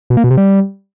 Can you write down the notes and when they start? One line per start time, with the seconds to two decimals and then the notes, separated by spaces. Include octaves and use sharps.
0.10 B2
0.17 A#3
0.24 B2
0.31 C3
0.38 G3